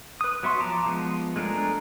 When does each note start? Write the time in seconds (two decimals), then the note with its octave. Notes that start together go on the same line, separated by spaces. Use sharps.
0.21 B4 D#6
0.43 F#3 B3 E5 C6 C#6
0.60 F3 A5 A#5 D6
0.86 F3 G#3 B3
1.36 G#3 A3 D4 G#4 A#4